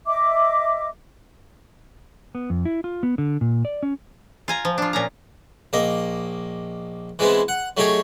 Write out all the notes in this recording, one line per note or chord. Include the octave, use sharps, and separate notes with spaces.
D#5 E5 D6
B3
F2
E4
F4
B3
D3
A#2
D5
C#4
F4 G#5 A#5
F3
D4 F4
A#2 C#4 A#5
A#1 A#3 D#5
E3 G#3 B3 C4 E4
F#5
F#3 A3 D#4 G4 G#4 C#5